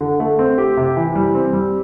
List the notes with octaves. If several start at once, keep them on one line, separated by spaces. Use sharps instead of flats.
D3
A3
C4
G4
C3
E3
G3
C4
G3